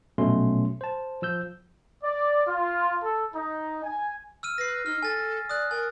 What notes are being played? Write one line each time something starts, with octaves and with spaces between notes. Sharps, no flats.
A#1 B2 F#3 A3 C#4 C6
C5 A5
F3 E6 G6
D5
F4
A4
D#4
G#5
E6 F6 D#7
B4 A#6 C7
D#4 F6
A4 G#5 A6
D5 D#6 F#6
A#4 G#5